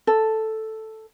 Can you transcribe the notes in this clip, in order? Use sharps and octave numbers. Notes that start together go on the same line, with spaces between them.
A4